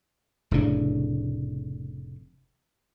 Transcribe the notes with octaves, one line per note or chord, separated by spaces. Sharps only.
F1 A2 C#3 D4